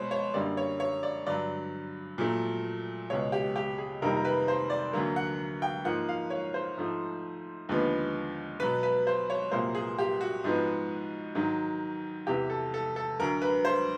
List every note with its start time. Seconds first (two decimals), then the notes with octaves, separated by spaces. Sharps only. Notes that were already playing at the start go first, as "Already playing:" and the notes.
Already playing: B2 G#3 C5 C#5
0.11 C#5
0.34 F#2 D3 G3 A#3 D5
0.57 C#5
0.80 C#5
1.03 D5
1.26 G2 D3 F#3 D5
2.18 A#2 F#3 A3
3.10 C#2 B2 G#3 C#5
3.32 G4
3.56 G4
3.78 G#4
4.02 F2 C3 D#3 G3 A#3 A#4
4.17 A#4
4.25 B4
4.48 C5
4.70 D5
4.93 D2 D3 F#3 A#3
5.16 F#5
5.62 G5
5.85 G#2 F3 A#3 F#5
6.09 F5
6.30 C#5
6.54 C5
6.77 G#2 F3 A3
7.69 D#2 D3 F3 G#3 B3
8.60 B2 F#3 B3 B4
8.83 B4
9.07 C5
9.30 C#5
9.52 C2 A#2 F#3 A#3 C5
9.75 G#4
9.99 G4
10.21 F#4
10.44 G#2 F3 G#3 B3
11.35 G#2 D#3 F#3
12.27 E2 C3 E3 G4
12.50 A4
12.74 A4
12.96 A4
13.19 D2 D3 F#3 A#4
13.42 B4
13.65 C5